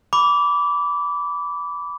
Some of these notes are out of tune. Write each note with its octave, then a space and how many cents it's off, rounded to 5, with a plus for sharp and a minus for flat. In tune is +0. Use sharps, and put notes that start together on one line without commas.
B5 +0 D6 -20